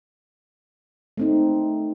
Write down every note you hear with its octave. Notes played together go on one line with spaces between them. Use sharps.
A3 C4 D#4